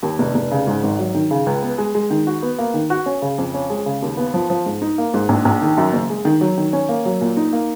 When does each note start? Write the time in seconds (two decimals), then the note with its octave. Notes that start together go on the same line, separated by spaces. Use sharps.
0.03 D#2
0.19 F1
0.35 F1
0.51 C#3
0.67 G#2
0.83 G#1
0.99 F#3
1.15 D#3
1.31 C#3
1.46 C#2
1.63 B3
1.78 G#3
1.95 G#3
2.10 D#3
2.27 F#4
2.42 B3
2.58 A#3
2.74 D#3
2.90 F#4
3.06 C#4
3.22 C#3
3.38 F2
3.54 C#4
3.70 G#3
3.86 C#3
4.02 D#2
4.17 B3
4.34 F3
4.50 F3
4.66 G#2
4.82 D#4
4.98 A#3
5.14 G#2
5.29 A#1
5.45 A#1
5.62 D#3
5.77 F#2
5.93 F#1
6.10 G#3
6.25 D#3
6.41 F#3
6.58 D#3
6.73 C#4
6.89 A#3
7.05 F#3
7.21 A#2
7.37 D#4
7.53 A#3